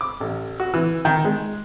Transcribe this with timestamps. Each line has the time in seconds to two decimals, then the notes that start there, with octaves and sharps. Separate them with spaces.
0.01 D6
0.20 A1
0.60 F#4
0.74 E3
1.05 D#3
1.24 G#3